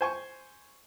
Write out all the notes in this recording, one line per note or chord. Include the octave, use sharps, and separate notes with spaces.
C5 G#5 C#6